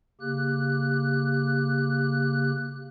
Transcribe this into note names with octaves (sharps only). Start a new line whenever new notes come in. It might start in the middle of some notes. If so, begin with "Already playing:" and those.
C#3 A#3 G4 F#6